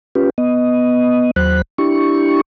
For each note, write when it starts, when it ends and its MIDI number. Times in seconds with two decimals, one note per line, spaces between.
0.15 0.30 61
0.15 0.30 65
0.15 0.30 67
0.15 0.30 71
0.38 1.31 59
0.38 1.31 75
1.36 1.62 39
1.36 1.62 54
1.36 1.62 72
1.36 1.62 83
1.36 1.62 90
1.78 2.41 62
1.78 2.41 64
1.78 2.41 67
1.78 2.41 85